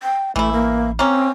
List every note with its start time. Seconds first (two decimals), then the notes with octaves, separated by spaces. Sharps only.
0.03 G5
0.36 A1 E3 A3 E4
0.53 A#3
0.99 A#3 C4 C#4